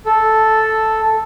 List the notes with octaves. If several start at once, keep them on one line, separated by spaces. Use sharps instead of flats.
A4